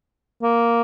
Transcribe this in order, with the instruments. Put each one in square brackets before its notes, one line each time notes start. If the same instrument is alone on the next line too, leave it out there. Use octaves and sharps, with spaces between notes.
[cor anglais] A#3